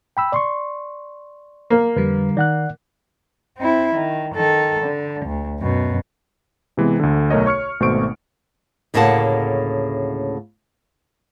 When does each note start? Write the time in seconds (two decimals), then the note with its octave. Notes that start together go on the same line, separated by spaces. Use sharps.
0.17 G5 B5 E6
0.32 D5 C6 C#6
1.70 A#3
1.96 F2 D3 G3 B4
2.37 D#3 D5 F#5 F#6
3.58 C4 E4
3.95 D#3
4.35 D#3 A4
4.83 D3
5.26 D2
5.59 F#2 B2
6.77 C3 E3 G#3 B3
7.00 D2 D3
7.30 B1 A3 A#4 C#5 D#5
7.46 C#5 C#6 F6 C#7
7.80 G#1 B2 A3 C5 C#6 D7
8.94 D2 A2 C#3 A#3 F#5 A5